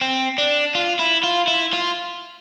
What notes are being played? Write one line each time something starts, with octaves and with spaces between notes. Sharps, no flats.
C4
D4
F4
E4
F4
E4
F4